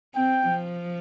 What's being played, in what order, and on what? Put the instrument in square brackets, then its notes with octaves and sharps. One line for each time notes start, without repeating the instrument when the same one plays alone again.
[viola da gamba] C4 [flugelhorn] G5
[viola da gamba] F3